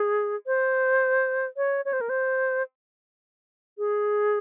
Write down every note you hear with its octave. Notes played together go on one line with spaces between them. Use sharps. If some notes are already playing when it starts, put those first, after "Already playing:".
Already playing: G#4
C5
C#5
C#5
C5
A#4
C5
G#4